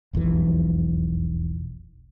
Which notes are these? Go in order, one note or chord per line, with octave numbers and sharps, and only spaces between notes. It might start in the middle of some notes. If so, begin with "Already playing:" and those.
E1 B1 F2 E3